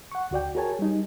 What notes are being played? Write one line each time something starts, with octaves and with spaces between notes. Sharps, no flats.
F#5 C#6
D2 F#4 D5 G5
F#4 G#4 A#4 C#5 G#5 A5
G3 D#4